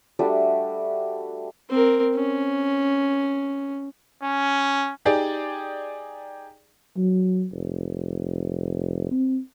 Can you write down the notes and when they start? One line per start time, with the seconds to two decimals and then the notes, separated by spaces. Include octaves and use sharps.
0.19 G3 A3 D4 F#4
1.70 C4 A#4
2.15 C#4
4.23 C#4
5.05 D#4 G4 G#4 D5 G5
6.97 F#3
7.53 F1
9.11 C4